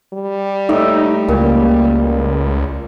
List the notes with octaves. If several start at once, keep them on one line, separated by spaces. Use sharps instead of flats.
G3
A2 D#4 E5 D6
C#2 A#2